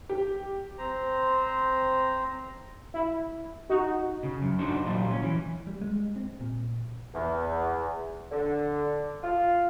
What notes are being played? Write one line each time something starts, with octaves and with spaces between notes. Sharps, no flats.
G4
C4 C5 A#5
E4
D#4 F#4
C#3
F#2
D4 D#4 F#4 C5
A#2 F#3 G3 F4
C#4
E3
G3
G#3
C4
A#2
E2
D3
F4